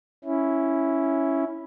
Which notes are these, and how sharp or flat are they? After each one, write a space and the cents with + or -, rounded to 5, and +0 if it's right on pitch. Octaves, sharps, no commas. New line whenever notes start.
C#4 +0 E4 +0